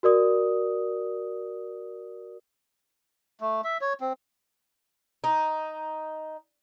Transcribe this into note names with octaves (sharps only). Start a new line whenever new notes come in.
F#4 A#4 D5 D#6
A3
E5
C#5
C4
D#4